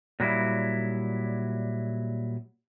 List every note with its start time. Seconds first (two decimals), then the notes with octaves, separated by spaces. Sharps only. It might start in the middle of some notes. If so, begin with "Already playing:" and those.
0.20 A#2 F#3 G3 E4